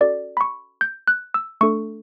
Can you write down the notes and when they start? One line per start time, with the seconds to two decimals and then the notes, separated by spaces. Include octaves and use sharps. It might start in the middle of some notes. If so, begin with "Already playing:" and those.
0.01 C#4 F#4 A4 D5
0.37 B5
0.41 C#6
0.81 G6
1.08 F#6
1.34 E6
1.61 A3 D4 A4 C#6